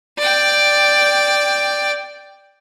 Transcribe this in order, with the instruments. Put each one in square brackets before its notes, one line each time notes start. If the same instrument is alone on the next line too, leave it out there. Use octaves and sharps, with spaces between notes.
[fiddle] D5 G5